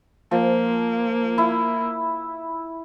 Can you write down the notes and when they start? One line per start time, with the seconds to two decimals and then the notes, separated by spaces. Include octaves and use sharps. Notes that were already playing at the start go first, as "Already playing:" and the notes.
0.31 F3 A#3
1.38 E4